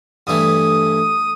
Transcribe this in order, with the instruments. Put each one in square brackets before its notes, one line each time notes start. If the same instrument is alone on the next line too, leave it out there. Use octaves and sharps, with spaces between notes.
[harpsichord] G2 E3 A3 [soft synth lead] D#6